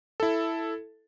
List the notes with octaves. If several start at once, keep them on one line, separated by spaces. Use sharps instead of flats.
E4 A4